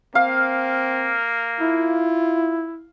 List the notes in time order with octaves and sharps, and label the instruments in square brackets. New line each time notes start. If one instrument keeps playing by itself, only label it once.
[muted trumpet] A#3 [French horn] C4 [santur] F5
[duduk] E4 [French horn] F4